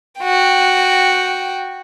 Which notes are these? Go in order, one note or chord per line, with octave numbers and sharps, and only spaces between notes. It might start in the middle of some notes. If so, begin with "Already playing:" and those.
F#4 G5